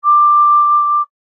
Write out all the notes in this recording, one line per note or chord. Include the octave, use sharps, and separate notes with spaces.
D6